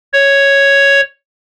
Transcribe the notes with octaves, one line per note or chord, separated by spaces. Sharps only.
C#5